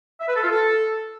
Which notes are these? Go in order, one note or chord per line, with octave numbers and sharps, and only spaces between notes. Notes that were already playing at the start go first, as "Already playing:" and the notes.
E5
B4
A4
F4
A4